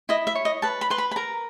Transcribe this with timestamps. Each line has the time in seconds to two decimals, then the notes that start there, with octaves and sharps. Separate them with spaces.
0.09 E4 D#5
0.27 E5
0.35 C#5
0.45 D#5
0.62 B4 A5
0.81 B5
0.90 B4 C6
0.98 B5
1.11 B5
1.16 A#4 A#5